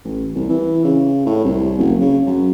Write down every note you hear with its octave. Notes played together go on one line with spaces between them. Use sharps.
A1
C2
E3
C#3
A2
C2
F#1
C#3
F#2